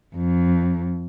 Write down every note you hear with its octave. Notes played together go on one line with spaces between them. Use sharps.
F2